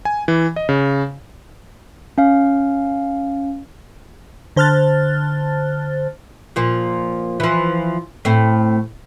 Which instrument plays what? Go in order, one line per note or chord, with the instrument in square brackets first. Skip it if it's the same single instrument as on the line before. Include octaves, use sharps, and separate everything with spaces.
[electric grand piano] G#5
E3
D#5
C#3
[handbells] C#4 F5
[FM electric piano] D3 C5 A5 F6 F#6 A6
[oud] A#2 F3
E3 F3
A2 C4